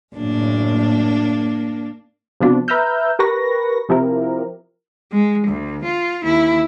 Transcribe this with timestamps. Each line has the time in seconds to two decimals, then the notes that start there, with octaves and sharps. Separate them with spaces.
0.16 F#1 A2 A#3 D4
2.40 C3 F3 B3 D4 F4 F#4
2.68 B4 E5 A#5 E6 F6 G6
3.19 G4 A#4 B4 C#6 A#6
3.89 C3 F3 E4 G4 A#4
5.12 G#3
5.47 D2
5.85 F4
6.24 D#2 E4